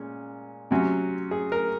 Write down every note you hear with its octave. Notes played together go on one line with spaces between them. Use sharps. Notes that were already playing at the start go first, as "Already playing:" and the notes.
Already playing: A#2 G#3 C#4
C3 F#3 C#4
G#4
A#4